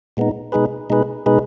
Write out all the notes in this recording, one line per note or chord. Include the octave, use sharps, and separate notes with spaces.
A#2 G#3 B3 D#4
B2 G#3 D#4 G#4 B4
B2 G#3 D#4 G#4 B4
B2 G#3 D#4 G#4 B4